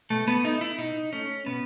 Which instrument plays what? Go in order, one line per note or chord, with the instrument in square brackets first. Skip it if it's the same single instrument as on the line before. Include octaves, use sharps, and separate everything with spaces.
[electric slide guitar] B2 A3
B3
A3 D#4
E4
B2 D#4
A3 C#4
B2 B3